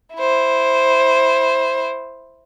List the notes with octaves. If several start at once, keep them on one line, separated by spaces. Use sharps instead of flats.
E4 C5